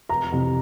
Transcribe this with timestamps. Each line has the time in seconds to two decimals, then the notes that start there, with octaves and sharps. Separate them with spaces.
0.09 F1 A#5
0.32 F2 C3 E3